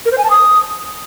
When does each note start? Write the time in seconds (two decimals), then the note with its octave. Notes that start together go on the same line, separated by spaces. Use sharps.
0.05 A#4
0.12 C5
0.18 G#5
0.24 A5
0.30 D#6